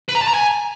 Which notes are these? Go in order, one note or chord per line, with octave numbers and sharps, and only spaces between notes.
B4
A#5
A5
A#5
G#5